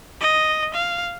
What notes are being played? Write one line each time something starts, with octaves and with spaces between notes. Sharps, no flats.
D#5
F5